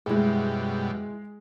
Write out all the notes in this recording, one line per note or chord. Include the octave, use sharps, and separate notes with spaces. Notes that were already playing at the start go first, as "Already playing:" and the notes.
F#2 B2 G3 G#3 E4 G#4 C5